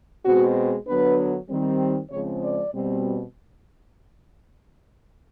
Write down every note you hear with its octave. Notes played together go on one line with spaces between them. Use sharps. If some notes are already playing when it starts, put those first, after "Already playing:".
B2 G#3 C4 F#4
D3 F#3 B3 D4 B4
D#3 G3 C4
C#3 F3 G#3 C4 C#5
D5
B2 G3 C4